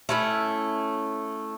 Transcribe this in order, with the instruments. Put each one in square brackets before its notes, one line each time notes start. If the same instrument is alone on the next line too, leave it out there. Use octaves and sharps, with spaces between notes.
[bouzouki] A3 C#4 E4